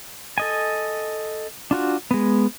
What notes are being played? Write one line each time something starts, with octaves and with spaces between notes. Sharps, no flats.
A4 D#5 G#5
D4 F4 F#4
G#3 B3